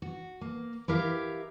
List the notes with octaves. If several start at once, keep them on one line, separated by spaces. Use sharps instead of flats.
F#4
A#3
E4 G4 A#4 E5 F5